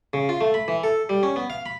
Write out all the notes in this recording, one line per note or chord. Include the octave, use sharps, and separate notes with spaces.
C#3
F4
A3
B5
E3
A4
G3
C#4
B3
F5
B5